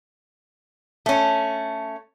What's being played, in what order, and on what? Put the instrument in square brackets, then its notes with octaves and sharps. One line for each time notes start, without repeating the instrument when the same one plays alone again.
[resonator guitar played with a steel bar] A3 C#4